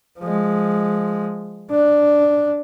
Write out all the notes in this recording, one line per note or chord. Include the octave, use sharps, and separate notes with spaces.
F3 G#3
D4